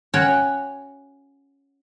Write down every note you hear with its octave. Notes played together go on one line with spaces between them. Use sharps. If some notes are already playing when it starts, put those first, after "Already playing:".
C#4 F#4 C#5 F#5 G5